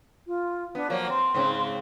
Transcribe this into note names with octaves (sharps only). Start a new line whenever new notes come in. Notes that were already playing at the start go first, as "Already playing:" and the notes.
F4
B3 D4
F3 F#3 A#3 C#5
C4 C6
G#2 C#3 C4